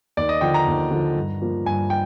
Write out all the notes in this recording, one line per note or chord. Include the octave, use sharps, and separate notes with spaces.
D#2 D5
D#5
D3 F3 G5
A#5
D#2
D3 F3
G2
F3 A#3
G2 G#5
G5